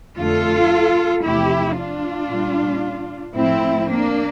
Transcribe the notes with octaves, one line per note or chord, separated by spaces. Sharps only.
F2 D3 A3 F4 A4
E2 C3 F3 A3 E4 G4
D4 F4
A#2 G3
A2 F3 A3 C4 E4
A#3 D4